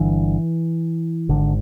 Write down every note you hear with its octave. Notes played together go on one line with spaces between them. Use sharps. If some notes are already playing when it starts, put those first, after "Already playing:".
Already playing: G1 G2 D3 E3
G#1 G#2 D3